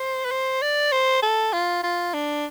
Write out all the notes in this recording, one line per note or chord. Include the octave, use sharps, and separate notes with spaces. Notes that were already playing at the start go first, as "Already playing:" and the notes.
Already playing: C5
B4
C5
D5
C5
A4
F4
F4
D4